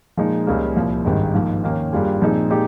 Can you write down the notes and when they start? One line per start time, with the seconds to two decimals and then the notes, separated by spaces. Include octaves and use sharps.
0.17 A#2 F3 G#3 D#4
0.47 C#2 C#3 G3 A#3
0.76 C2 A#2 F3
1.05 G#1 G2 D#3 G#3 D#4
1.34 G#2 F3 A#3
1.64 D#2 D#3 A#3 C#4
1.93 G2 G3 A#3 F4 G#4
2.22 A#2 F3 C4 D#4 G#4
2.50 A#2 G#3 D#4 G4